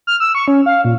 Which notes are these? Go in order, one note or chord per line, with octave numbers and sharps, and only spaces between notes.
F6
E6
C#6
C#4
F5
A#2